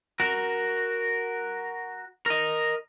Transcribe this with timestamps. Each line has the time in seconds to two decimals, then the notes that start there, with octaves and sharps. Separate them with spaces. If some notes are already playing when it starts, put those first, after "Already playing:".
0.20 F#4 A#4
2.26 A#4 D#5